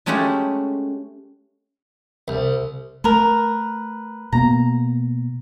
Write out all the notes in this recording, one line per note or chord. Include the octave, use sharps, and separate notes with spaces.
G#3 A3 C#4 F#4 G4 F#5
C2
A3 A#4 B4
B2 A#3 B3 A#5